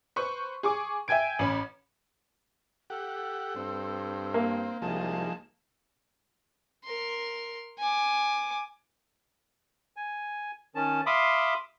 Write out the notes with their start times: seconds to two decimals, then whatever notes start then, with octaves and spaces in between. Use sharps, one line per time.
0.16 B4 C5 C#6
0.63 G#4 C#6 D6
1.08 E5 G5 G#5 G#6 D7
1.39 A1 C#4 B5
2.90 G4 A4 F#5
3.56 G2 C4
4.34 A#3
4.82 C2 F3 G#3 D#4 A5
6.84 A#4 C6
7.79 G#5 D6
9.96 G#5
10.75 D#3 C#4 A5
11.06 E5 F5 B5 C6 D6 D#6